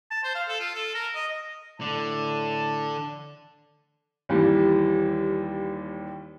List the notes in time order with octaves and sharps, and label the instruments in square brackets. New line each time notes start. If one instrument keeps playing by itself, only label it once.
[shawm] A5
C5
F5
A4
F4
A4
A#4
D#5
[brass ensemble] A2 A5 [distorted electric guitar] D3
[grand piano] D#2 E3 G3